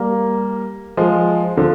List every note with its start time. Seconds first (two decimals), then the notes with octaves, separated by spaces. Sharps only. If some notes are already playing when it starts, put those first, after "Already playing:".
Already playing: G3 A#3
0.97 F3 G#3
1.57 D3 F3